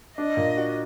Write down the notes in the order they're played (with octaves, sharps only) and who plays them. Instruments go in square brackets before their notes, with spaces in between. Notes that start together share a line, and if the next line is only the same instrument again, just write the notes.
[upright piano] D4 [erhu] D#5
[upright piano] A#2
F#4